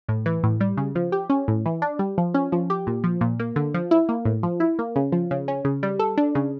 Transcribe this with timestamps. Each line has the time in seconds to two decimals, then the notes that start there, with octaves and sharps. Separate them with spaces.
0.09 A2
0.26 E3
0.43 A2
0.61 G3
0.77 C#3
0.95 F3
1.12 G4
1.30 C#4
1.48 A2
1.66 E3
1.82 D4
1.99 G3
2.18 F3
2.34 C#4
2.52 F3
2.70 G4
2.87 A#2
3.04 F3
3.21 A#2
3.40 A#3
3.56 D3
3.74 F3
3.91 E4
4.09 A#3
4.25 A2
4.43 F3
4.60 E4
4.79 A#3
4.96 C#3
5.12 F3
5.31 C#3
5.48 C#4
5.65 C#3
5.83 G3
5.99 A4
6.17 D4
6.35 C#3